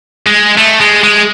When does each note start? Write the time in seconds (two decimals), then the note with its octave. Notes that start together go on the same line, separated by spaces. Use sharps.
0.27 G#3
0.57 A3
0.80 G#3
1.03 G#3